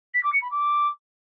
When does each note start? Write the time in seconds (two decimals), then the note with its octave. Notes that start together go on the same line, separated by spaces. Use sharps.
0.14 B6
0.23 D6
0.32 C#7
0.42 B5
0.51 D6